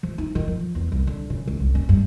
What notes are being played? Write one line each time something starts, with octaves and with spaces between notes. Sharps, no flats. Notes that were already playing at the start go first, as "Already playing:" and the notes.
F3
D#4
D#3
F3
E2
C2
D3
C#3
C#2
C2
C#4
G2